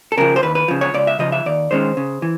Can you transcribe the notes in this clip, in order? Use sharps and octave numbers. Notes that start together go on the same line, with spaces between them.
A4
C#3 F3 A#4
C5
D#2 B4
B4
C#3 F3
C#5
C#2 D5
E5
C#3 F3 D#5
E5
D#2 D5
D#3 G#3 C#4 C5
C#3
E3